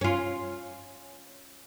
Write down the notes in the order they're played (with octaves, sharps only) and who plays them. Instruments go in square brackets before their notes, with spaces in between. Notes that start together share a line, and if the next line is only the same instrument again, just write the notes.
[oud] C#4 F4